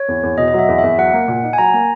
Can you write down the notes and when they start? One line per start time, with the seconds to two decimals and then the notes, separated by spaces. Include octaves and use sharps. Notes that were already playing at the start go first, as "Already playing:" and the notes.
Already playing: C#5
0.08 E2
0.23 E2
0.38 B2 D#5
0.48 D#5
0.54 F#3 E5
0.68 E2
0.79 E5
0.84 E2
0.98 F#3 F#5
1.13 A#3
1.28 A#2
1.43 D#4
1.53 G#5
1.58 F#3 A#5
1.74 A#3